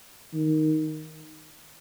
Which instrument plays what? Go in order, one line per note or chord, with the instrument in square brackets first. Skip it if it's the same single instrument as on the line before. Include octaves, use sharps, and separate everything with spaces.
[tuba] D#3